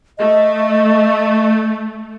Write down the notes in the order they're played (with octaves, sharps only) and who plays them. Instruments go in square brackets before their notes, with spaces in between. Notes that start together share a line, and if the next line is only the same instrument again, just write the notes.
[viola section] A3 [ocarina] D#5